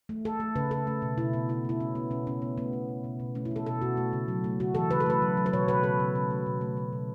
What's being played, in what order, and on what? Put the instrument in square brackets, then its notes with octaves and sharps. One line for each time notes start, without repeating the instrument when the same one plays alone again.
[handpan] A3
A3 A4
A3
C#3 B4
C#3 A4
A3
B2
B2 E4
B2 B3
C#3 E4
A3 E4
C#3 C#4
A3 B3
B2 C#4
A3 C#4
A3 B3
A3 B3
A3
B2
B2
B2
A3 C#4
E4
A3 A4
B2 A4
B2 F#4
A3
C#3
F#3
A3
C#3 F#4
E3 A4
C#3 B4
A4
A3 B4
F#3
F#3
B4
B2 C#5
B2 B4
C#3 A4
C#3
C#3
A3
B2
A3
A3
B2